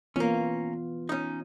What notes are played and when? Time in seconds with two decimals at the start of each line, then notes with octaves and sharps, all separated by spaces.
0.16 E3 A#3 B3 C#4 F4
1.09 C#4 D#4